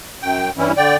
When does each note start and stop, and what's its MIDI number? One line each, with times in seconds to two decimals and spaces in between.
0.22 0.50 42
0.22 0.50 79
0.58 0.72 43
0.58 0.72 52
0.58 0.72 55
0.58 0.72 61
0.58 0.72 64
0.77 0.97 50
0.77 0.97 74
0.77 0.97 79